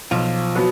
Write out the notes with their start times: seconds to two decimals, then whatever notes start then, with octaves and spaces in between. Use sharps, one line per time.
0.11 B1 F3 F4
0.55 B2 F#3 B3 F#4